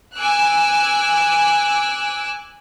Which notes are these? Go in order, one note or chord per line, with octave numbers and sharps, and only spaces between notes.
G#5 D6 E6 F#6